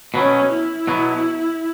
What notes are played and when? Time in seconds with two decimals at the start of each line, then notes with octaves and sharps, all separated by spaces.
0.14 B2 F#3 B3 C#4
0.52 E4
0.87 B2 F#3 B3